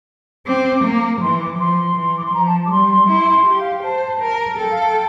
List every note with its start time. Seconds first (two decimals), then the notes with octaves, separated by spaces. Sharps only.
0.46 C4 D6
0.84 A#3
1.21 E3 C6
1.41 D6
1.58 F3 C6
1.96 E3
2.16 D6
2.25 C6
2.33 F3 A#5
2.46 A5
2.65 D6
2.71 G3 C6
2.89 C6
3.08 E4 C6
3.46 G4
3.60 F5
3.72 G5
3.83 C5 A5
4.21 A#4
4.58 A4 G5
4.70 F5
4.82 G5